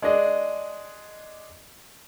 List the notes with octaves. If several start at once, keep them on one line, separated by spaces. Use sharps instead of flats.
G#3 D4 D5 D#5